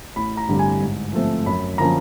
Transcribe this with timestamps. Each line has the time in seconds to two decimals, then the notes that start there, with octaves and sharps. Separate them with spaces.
0.16 A1 B5
0.37 A#5
0.48 G2 D3 G3 C4
0.59 G#5
0.82 G#2
1.13 F3 A3 C4
1.46 F#2 B5
1.78 D3 F3 A#3 C#4 A#5